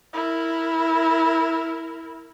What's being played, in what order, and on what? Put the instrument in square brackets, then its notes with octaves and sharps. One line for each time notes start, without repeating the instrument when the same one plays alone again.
[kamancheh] E4 A#4